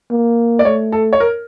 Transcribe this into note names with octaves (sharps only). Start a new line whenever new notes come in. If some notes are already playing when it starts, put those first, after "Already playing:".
A#3
D5
A3 C#5
A4
C#5
A#4